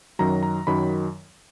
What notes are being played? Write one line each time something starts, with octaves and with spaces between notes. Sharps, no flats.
F#2 D#3 F#3 A#5
A#5
F#2 D#3 F#3 B5